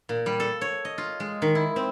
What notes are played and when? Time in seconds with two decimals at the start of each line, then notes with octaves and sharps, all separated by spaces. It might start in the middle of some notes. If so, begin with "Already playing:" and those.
0.09 A#2
0.26 G3
0.40 A4
0.61 C#5
0.85 D#5
0.98 F4
1.20 G#3
1.42 D#3
1.55 E4
1.76 C4